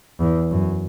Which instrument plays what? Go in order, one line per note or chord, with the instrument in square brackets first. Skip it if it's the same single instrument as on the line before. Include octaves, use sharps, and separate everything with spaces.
[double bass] E2
F#2